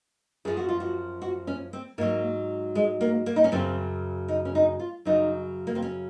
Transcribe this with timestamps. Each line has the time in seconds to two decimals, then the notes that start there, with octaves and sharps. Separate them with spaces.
0.45 F#2 F3 G#4
0.57 F#4
0.69 F4
0.80 F#4
1.22 F#4
1.47 C#4
1.73 C4
1.98 G#2 F#3 A#3
2.75 G#3
3.01 A#3
3.26 A#3
3.36 D#4
3.44 C#4
3.52 F#2 C#3 F#3 C4
4.28 D#4
4.45 C#4
4.55 D#4
4.80 F4
5.05 F#2 C#3 F#3 D#4
5.67 A#3
5.75 C4
5.82 C#4